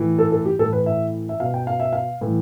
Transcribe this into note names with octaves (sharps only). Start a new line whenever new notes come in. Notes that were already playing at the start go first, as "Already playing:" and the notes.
Already playing: A2 E3
A4
A4
G4
A2 E3 A4
B4
E5
E5
B2 F5
G5
F5
E5
F5
A2 E3